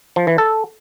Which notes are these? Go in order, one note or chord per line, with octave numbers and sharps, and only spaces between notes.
F3
E3
A4